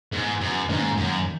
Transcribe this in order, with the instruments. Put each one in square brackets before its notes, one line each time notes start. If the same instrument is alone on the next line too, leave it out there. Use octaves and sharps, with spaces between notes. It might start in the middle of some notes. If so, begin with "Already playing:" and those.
[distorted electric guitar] G#2 [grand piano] E3 G#3 B3
[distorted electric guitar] F#2
[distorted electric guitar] G#2 [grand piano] D#3 A#3 C#4
[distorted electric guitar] F#2